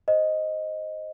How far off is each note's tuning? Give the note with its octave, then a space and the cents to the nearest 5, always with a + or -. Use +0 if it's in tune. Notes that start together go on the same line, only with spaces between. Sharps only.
C5 +0 D#5 +0